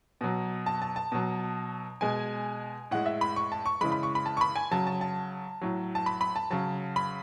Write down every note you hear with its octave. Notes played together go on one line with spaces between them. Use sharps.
B2 F#3
A5
A5
A5
B2 F#3
B2 G#3 G#5
A2 G#3 F#5
E5
B5
C#6
A5
C#6
C#3 E3 G#3 B5
B5
C#6
B5
A5
C#6
B5
G#5
C#3 F#3 A5
A5
A5
A2 F#3
A5
B5
B5
A5
C#3 F#3 A5
B5